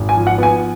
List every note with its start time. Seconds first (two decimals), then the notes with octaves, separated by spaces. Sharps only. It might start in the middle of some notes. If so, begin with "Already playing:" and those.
Already playing: G#1
0.09 G#5
0.15 F3
0.27 F#5
0.38 B3 G#5